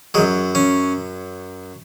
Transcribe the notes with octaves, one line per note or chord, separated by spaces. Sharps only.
F#2 F#3 G#3
C#4